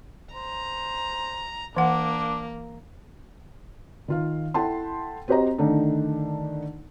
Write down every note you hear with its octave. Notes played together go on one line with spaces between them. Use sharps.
C5 A#5
E3 A#3 D4 F#5
D#3 F4 F5
E4 A4 F#5 G5 A5 C6
C4 F#4 G4 C5 D#5 A#5
D3 D#3 A3 D4 D#4